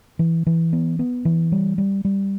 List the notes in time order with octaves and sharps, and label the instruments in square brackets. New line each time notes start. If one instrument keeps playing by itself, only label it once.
[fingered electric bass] E3
E3
B3
B3
E3
G3
G3
G3